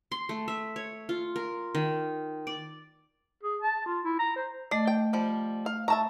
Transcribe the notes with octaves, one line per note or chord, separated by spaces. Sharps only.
C6
A3
E5
C#5
F4
A#4
D#3
D5
G#4
A5
F4
E4
A#5
C5
A3 D5 D#5
G5
F3 G3
F5
E5 A5 A#5 C#6